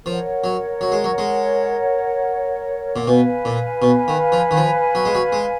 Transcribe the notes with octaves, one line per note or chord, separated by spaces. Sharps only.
F3 A#4 C#5 F#5
F#3
F#3
G#3
F#3
G#3
A#2
B2 B4 F5 G#5
A#2
B2
D#3
F3
D#3
F3
F#3
G#3
F#3
G#3